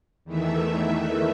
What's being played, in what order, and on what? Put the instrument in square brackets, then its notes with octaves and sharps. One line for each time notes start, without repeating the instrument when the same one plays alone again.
[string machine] E2 D#3 E3 A3 E5